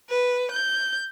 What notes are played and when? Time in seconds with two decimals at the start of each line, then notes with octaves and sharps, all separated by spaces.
0.10 B4
0.52 G6